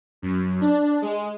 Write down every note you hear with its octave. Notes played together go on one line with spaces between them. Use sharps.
F#2
D4
G#3